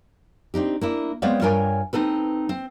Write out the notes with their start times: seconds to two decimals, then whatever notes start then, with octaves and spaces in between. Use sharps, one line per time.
0.54 C4 D4 D#4 G4
0.81 A#3 D4 E4
1.22 G#3 B3 C4 C#5 D5 F5
1.41 G2 F4 A#4 C#5 G5 G#5
1.93 C4 D#4 A4 B4
2.49 C4